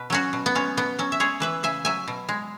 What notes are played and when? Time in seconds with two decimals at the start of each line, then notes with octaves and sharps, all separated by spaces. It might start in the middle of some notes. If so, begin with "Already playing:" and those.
Already playing: B2 B4
0.10 F#3 C#4 F#4
0.33 B2
0.46 B3
0.55 G#3 C#4
0.77 B2 B3
0.99 F#3 C#4
1.12 E5
1.20 G#3 G#4 C#5
1.40 E3 B4 E5
1.63 C#3 E5 G#5
1.85 F#3 E5 G#5
2.08 B2
2.29 G#3